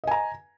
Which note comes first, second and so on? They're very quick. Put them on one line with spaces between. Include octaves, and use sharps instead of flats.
D#5 G#5 A#5